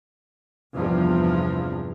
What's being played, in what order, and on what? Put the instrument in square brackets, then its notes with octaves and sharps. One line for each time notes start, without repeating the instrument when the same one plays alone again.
[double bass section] E2 G2 C3 F3